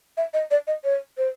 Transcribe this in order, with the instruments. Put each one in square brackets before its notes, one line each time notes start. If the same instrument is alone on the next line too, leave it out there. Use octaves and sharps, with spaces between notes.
[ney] E5
D#5
D5
D#5
C#5
C5